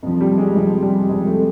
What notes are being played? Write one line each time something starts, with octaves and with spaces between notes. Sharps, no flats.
F2 C3 F3
G3
G#3
F2 C3 F3 G#3
G3
F2 C3 F3 G#3
A3